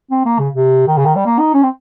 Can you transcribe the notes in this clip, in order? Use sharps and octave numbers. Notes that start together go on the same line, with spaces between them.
C4
A#3
C#3
C3
D#3
C#3
D#3
G3
A#3
D#4
C#4
C4